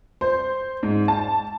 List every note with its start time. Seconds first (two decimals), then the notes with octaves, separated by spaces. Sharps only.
0.21 C5
0.83 G#2
1.08 A5